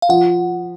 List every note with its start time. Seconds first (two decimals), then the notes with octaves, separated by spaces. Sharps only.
0.02 F5
0.09 F3 F#5